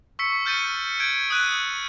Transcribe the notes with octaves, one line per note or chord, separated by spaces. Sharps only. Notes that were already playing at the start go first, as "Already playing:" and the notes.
C#6 E6 B6 C#7
F6 G6 A6 C#7 D#7
G6 G#6 D7
D#6 F#6 D#7